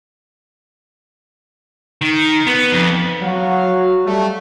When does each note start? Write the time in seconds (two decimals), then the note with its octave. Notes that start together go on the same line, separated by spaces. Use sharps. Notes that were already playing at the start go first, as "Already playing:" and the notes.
2.01 D#3
2.47 B3
2.72 F2
3.22 F#3 F#4 F5
4.05 G3 A3